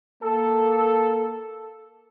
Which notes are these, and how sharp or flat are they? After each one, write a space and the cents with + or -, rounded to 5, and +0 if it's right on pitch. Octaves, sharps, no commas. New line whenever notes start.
A#3 +0 A4 +0